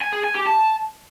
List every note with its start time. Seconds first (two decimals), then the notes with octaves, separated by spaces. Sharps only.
0.01 G#5
0.12 G#4
0.24 G#5
0.35 G4
0.46 A5